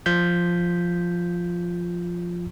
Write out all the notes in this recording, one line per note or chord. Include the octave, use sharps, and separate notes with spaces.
F3 F4 G6 B6